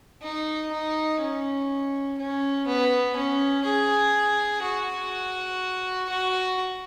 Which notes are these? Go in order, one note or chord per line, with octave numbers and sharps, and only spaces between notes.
D#4
D#4
C#4
C#4
B3
C#4
G#4
F#4
F#4